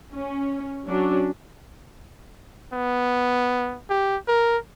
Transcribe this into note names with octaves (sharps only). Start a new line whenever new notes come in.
C#4
F#3 C#4 D4
B3
G4
A#4